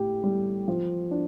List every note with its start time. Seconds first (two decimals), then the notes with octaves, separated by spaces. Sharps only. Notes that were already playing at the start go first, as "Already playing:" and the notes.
Already playing: A2 G4
0.23 G3
0.68 F3
1.11 D4